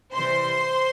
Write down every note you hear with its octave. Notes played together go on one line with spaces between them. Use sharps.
C3 E3 G3 C5 C6